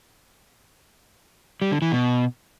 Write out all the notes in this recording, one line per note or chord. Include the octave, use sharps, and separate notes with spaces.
G3
D3
E3
B2